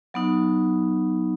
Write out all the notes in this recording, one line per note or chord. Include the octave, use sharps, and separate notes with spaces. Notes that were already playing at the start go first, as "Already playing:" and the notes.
F#3 B3 D#4